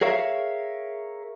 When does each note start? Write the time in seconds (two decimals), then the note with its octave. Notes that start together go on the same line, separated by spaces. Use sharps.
0.01 G#4 A#4 C#5 E5 F5